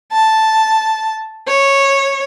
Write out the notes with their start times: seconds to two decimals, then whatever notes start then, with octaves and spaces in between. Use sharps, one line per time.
0.11 A5
1.48 C#5